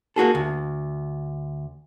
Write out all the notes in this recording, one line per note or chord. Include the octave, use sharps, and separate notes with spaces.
A#3 F#4 G#4 A4
D2